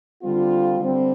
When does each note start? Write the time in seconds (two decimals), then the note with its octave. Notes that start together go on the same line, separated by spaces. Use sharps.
0.22 D3 G3 C4 F4
0.80 D3 G3 C4